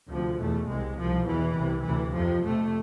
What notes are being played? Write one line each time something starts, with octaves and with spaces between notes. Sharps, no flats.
D2 C3 F3
E2 B2 A3
C2 C3 G#3
C2 B2 F3
E2 B2 E3
C2 C3
D2 C3 E3
F2 C3 F3
F2 C3 A3